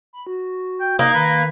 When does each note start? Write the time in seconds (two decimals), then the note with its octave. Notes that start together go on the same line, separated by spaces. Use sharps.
0.13 B5
0.27 F#4
0.81 G5
0.99 A#3 D#4
1.14 D#3 B4